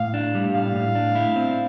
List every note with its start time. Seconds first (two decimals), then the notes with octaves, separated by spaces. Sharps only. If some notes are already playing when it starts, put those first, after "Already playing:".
Already playing: A2 F5
0.14 D4
0.35 G3
0.54 A2 F5
0.75 A2
0.95 D4
1.15 E4
1.36 C4